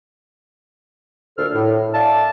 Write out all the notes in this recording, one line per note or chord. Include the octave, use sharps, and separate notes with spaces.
D2 A#2 D3 A4 C5 F6
A2
D5 E5 F5 A5